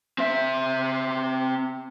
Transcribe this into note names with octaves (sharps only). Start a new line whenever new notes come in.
C4 E5